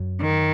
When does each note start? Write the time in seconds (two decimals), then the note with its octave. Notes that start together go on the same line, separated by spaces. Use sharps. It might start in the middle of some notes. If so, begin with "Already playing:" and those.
Already playing: F#2
0.21 D#3